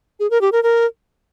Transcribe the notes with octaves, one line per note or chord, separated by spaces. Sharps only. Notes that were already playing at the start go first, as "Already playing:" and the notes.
G#4
A#4
G4
A#4
A#4